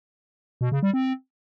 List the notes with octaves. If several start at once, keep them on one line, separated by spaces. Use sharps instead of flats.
B2
C#3
G3
C4